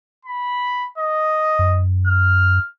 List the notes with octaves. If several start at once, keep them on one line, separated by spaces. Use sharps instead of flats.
B5
D#5
F#2
F6